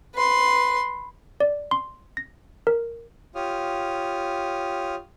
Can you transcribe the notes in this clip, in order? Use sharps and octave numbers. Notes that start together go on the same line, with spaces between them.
B4 C6
D5
C6
A#6
A#4
F4 G4 C#5 D#6 F6